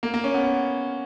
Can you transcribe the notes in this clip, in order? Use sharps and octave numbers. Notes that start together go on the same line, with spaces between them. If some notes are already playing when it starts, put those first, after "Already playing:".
A#3
A#3
C#4
B3